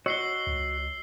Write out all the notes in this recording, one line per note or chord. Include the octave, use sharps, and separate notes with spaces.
F#4 C#5 D#5 E6 C7 G7
C#2